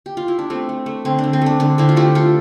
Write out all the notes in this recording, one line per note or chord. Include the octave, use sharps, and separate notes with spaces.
G4
F4
E4
D4
A3 C4
A3
A3
D3 C4
D4
D3
C4
A3 D4
D3 D4
D3 C4 E4
F4
A3 E4 G4
A3 F4 A4